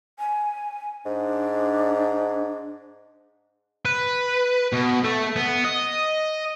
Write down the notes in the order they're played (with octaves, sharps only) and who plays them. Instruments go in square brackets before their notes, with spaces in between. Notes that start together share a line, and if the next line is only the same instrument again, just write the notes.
[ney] G#5
[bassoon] G#2 [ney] D4
[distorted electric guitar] B4
B2
A3
B3
D#5